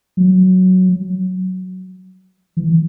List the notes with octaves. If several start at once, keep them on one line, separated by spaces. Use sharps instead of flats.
F#3
E3